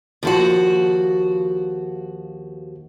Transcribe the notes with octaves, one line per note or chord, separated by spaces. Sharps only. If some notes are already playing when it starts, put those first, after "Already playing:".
D#2 F3 F#4